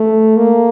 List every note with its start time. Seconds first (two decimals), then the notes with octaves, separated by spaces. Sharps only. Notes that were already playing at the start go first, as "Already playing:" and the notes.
Already playing: A3
0.36 A#3